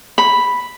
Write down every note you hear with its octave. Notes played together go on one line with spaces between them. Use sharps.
B5